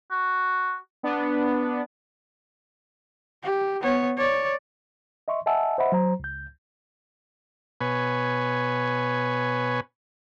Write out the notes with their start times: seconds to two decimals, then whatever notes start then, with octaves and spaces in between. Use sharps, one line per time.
0.11 F#4
1.03 B3 D4
3.43 G4
3.81 B3 C#5
4.17 C#5 D5
5.28 D#5 E5 C6 C#6
5.46 D#5 E5 F#5 G#5 A5 E6
5.78 C5 D#5 E5 F#5 B5
5.92 F#3 C5 A#5
6.20 C#2 G6
7.81 B2 B4 C#5 G#5